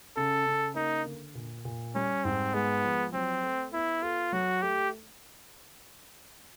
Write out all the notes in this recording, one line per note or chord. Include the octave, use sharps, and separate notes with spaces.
C#3 A4
C#3
A#3 D#4
D3
A#2
A#2
G3 C#4
G#2 C4
G#3 B3
F3
F#3 C4
A3
B3 E4
F4 A4
F#3 F#4
A3 G4